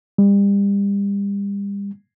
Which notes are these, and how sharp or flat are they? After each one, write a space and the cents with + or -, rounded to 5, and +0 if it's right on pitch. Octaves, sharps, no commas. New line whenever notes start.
G3 +35